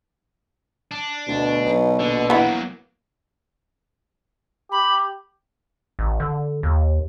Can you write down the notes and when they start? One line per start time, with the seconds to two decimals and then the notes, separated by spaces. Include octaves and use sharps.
0.91 D4
1.28 D2 B2
1.66 B1
2.00 A#1 D3
2.30 E3 F#3 A#3 B3
4.72 G4 B5
5.99 A1
6.20 D3
6.63 D#2